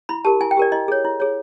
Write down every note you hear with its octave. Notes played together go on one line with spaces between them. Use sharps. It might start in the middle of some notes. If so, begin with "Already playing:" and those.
E4 B5
G4 A#4 A5
E4 G#5
G5
G4 A#4 D5
E4 D#5
G#4 C#5
E4
G#4 C#5